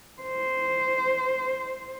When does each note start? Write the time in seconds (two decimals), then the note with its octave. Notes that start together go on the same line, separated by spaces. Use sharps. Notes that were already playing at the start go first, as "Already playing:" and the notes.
0.23 C5